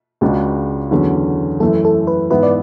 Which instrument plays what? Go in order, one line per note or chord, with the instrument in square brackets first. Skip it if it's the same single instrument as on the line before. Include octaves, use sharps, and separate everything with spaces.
[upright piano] C#2 C#3 G#3 D4 F#4
E2 D3 F#3 C#4
[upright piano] F#2 E3 A3 [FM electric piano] A4
[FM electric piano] A4
B4
[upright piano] G#2 E3 B3 E4 [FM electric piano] B4
[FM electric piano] D5